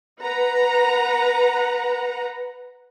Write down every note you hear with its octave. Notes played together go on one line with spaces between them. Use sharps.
B4 F#5 A#5